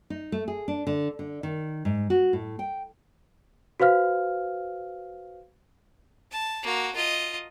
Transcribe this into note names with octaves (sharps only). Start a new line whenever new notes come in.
D#4
A3
G#4
D4
D3
D3
D#3
G#2
F#4
A2
G5
F#4 B4 C5 F5 F6
A5
A#3 F#4
F4 D#5